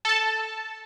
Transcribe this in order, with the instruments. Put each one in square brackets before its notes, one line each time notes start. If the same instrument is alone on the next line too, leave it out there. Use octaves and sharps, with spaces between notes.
[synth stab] A4 A5